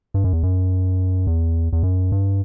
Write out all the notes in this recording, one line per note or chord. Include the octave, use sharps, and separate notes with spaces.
G2
F#2
E2
F#2
E2
E2
F#2
G2